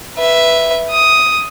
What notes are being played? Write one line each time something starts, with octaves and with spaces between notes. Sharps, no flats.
B4 E5
D#6